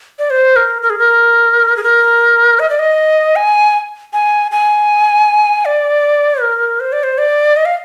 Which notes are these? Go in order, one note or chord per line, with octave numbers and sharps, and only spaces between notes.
D5
C5
A#4
A#4
G#4
A#4
G#4
A#4
D#5
D5
D#5
G#5
G#5
G#5
D5
A#4
C5
D5
C5
D5
D#5
F5